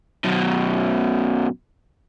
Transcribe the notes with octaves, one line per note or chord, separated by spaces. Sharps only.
F#2 B2